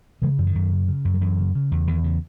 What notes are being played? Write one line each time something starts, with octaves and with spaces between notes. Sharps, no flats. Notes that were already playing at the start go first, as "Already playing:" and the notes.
C#3 E3 G#3
F#2 E3
D#3
F#2
C#3
C#3
F#2
F#3
F#2 E3
C#3
C#3
E2
E2 D#3
C#3